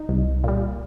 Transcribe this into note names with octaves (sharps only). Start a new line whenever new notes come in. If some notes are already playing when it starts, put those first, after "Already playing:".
Already playing: D#4
C2
A#2 G3